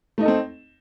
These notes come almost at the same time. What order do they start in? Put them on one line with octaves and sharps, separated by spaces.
A3 D#4 D#5 A4 C4